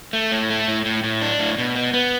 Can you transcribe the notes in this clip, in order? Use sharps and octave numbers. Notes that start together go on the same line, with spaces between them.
A3
A2
A3
A2
A2
A2
D4
A2
B2
B3
B3